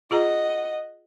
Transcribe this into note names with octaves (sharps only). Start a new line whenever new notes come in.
F4 G#4 D#5 F#5 A#5